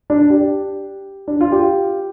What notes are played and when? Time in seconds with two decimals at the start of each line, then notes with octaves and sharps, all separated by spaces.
0.10 D4
0.30 G4
1.28 D4
1.41 F4
1.52 G4